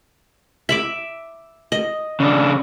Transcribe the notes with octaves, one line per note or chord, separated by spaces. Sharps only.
E5 B5 D6
D#5
C#3 D4